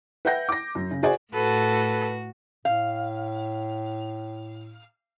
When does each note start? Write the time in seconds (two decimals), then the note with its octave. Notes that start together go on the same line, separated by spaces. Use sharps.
0.25 B4 E5 F#5 G5 G6 A#6
0.49 D6 A#6
0.75 F#2
0.91 C#3
1.03 F#4 G#4 C5 D5 G#5
1.33 A2 F#4 A4 B4
2.65 A2 F5